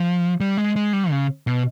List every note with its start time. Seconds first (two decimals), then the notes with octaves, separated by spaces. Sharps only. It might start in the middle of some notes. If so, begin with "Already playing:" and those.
Already playing: F3
0.40 G3
0.57 G#3
0.76 G#3
0.93 G3
1.11 C#3
1.47 B2